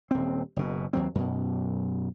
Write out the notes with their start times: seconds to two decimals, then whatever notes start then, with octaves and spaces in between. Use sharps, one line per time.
0.11 D#1 C4
0.56 F#1 B2
0.93 D#2 F#3 C4
1.15 F#2 B2